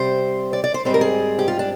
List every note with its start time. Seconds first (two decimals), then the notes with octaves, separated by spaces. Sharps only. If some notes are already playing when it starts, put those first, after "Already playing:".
Already playing: C3 G3 C4 C5
0.53 D5
0.64 D5
0.74 C5
0.85 G#2 G3 C4 C5
0.94 A#4
1.01 G#4
1.39 G4
1.48 F4
1.59 D4